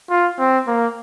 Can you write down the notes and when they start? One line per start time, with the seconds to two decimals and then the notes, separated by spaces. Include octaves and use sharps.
0.10 F4
0.39 C4
0.67 A#3